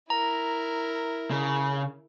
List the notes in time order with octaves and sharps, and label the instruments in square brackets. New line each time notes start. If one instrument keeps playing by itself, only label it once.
[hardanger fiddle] E4 A#4 [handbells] A#5
[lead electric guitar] C#3